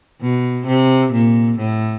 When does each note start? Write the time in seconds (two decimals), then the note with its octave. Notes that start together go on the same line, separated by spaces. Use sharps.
0.22 B2
0.67 C3
1.13 A#2
1.58 A2